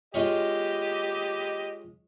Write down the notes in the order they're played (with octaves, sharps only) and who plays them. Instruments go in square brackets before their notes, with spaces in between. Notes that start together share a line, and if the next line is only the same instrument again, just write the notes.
[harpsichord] G#3 F4 C#5 [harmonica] G4 D#5